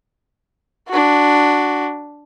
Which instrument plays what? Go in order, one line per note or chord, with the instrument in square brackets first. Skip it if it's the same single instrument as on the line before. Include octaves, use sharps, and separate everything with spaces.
[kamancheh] D4 F#4